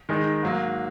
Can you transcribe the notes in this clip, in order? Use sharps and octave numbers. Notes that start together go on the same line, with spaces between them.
D#3 G#3 D#4
G#2 F#3 A#3